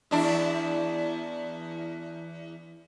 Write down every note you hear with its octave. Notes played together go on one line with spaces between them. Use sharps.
E2 D4 E4